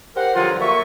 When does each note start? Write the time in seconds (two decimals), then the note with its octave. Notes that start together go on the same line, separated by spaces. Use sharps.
0.16 G4 A#4 C5 F#5
0.36 G2 D3 F3 F#3 F4
0.60 A#3 F#4 E5 C#6